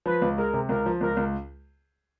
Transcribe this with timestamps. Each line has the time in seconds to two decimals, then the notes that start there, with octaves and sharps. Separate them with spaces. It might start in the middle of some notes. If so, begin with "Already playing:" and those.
0.06 F3 B4
0.22 C#2
0.38 G#3 A#4
0.54 C3
0.69 C#2 A#4
0.86 F3
1.01 C#2 A#4
1.17 C#2